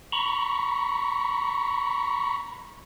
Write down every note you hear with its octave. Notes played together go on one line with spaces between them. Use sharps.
A#5 B5 C#6